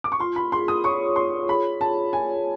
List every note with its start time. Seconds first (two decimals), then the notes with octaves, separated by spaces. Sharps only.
0.04 D6
0.12 C#6
0.20 F4 C6
0.36 B5
0.52 G#4 C6
0.68 D#6
0.84 C#5 C#6
1.16 F4 C6
1.48 G#4 B5
1.81 G#4 A5
2.13 C#5 G#5